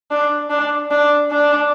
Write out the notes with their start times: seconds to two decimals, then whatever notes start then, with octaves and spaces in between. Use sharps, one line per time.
0.11 D4
0.50 D4
0.91 D4
1.31 D4